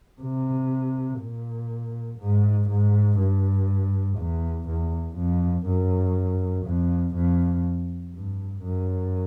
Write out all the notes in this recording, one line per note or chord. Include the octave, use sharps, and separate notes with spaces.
C3
A#2
G#2
G#2
G2
E2
E2
F2
F#2
F2
F2
G2
F#2